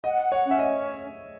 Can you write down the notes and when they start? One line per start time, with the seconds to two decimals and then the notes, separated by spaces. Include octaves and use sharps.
0.04 D#5 F#5
0.32 C#5
0.45 C#4
0.51 E5
0.59 D#5